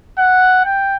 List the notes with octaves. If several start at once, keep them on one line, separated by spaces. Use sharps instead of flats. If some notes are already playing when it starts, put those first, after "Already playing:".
F#5
G5